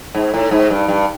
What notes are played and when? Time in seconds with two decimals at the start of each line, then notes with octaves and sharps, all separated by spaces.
0.15 G#2
0.34 A2
0.51 G#2
0.70 G2
0.88 G2